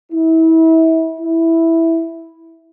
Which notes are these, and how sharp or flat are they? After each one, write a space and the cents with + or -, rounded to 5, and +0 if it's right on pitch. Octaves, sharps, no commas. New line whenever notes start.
E4 -30
E4 -5